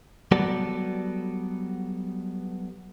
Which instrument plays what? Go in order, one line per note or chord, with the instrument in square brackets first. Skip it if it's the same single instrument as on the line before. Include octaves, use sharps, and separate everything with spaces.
[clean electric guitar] F#3 G3 B3 F#4 A4 D5